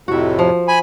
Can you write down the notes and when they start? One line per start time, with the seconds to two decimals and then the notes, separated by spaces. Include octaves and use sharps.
0.08 F2 A2 C3 F#4 E5
0.39 F3
0.68 G#5 B5